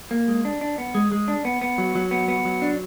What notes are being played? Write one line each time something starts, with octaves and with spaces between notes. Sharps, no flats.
A#3
G#3
D4
D4
B3
G#3
G#3
D4
B3
B3
F#3
F#3
B3
B3
F#3
D4